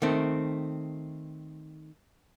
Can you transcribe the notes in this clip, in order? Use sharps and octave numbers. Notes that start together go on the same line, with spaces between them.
D#3 A3 C4